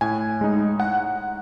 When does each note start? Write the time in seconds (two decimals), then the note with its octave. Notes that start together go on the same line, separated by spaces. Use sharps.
0.01 A2 G#5
0.41 G#3 D#4
0.80 F#5